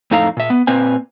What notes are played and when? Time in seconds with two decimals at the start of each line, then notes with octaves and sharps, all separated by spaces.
0.11 F2 A2 D#4 A4 F5 A#5
0.37 A#2 E5
0.50 B3
0.67 A#2 A#3 C4 B4 G#5